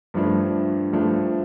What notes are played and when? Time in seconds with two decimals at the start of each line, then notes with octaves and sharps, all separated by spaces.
0.14 G2 F3 A3 D4
0.93 G2 F3 A3 D4